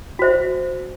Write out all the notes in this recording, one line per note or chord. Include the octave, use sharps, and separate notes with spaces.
F#4 C5 E5